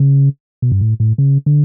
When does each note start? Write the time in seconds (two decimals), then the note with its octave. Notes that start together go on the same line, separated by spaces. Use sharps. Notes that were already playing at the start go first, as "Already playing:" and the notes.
Already playing: C#3
0.62 B2
0.72 G2
0.81 A2
1.00 A2
1.18 C#3
1.46 D3